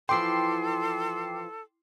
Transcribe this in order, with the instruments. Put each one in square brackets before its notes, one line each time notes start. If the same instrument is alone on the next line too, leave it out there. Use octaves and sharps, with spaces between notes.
[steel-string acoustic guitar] E3 F3 [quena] A4 [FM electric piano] G5 D6 C7 [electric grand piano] C6